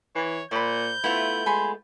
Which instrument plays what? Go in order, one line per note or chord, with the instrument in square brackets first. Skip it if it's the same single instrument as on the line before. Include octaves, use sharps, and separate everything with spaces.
[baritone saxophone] E3 [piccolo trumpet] C#5
[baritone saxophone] A#2 [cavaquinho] C5 B5 [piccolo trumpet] G6
[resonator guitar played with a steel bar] A3 B3 F4 [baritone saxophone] E4
[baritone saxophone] G#3 [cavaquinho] G#5 B5 C6